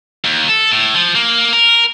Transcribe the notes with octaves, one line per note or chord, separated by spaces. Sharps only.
D#2
A4
A2
F3
A#3
A#4